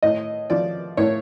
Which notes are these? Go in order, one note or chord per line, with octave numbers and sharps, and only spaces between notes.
A2 D#5
F3 D5
A2 C#5